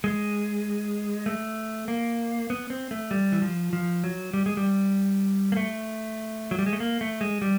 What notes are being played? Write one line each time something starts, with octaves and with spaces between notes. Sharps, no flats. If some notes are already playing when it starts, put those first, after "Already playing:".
G#3
A3
A#3
B3
C4
A3
G3
E3
F3
F3
F#3
G3
G#3
G3
A#3
A3
F#3
G3
G#3
A3
A#3
A3
G#3
G3